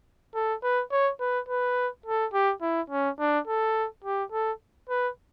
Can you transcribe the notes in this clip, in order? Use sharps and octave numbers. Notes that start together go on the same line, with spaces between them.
A4
B4
C#5
B4
B4
A4
G4
E4
C#4
D4
A4
G4
A4
B4